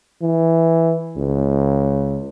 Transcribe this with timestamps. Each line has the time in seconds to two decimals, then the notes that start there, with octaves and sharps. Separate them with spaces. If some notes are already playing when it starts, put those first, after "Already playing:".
0.22 E3
1.17 C#2